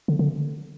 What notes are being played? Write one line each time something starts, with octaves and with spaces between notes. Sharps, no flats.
D3
D3